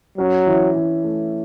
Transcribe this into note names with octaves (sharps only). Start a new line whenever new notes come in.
F#3 C#4
E3
E3
A3